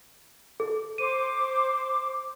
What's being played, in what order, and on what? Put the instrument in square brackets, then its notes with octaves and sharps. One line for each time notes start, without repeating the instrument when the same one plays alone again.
[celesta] A4
[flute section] C5 D6 [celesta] D#7